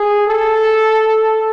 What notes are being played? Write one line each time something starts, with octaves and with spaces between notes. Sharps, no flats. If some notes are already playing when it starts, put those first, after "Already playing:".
Already playing: G#4
A4